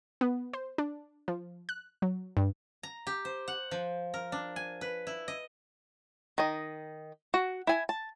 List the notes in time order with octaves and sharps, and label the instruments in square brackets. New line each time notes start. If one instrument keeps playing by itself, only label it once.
[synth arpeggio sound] B3
C5
D4
F3
F#6
F#3
G2
[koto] A#5
G4
C5
F#5
F3
A#4
D4
G#5
B4
E4
D#5
[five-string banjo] D#3 D#5
F#4
E4 G#5
A5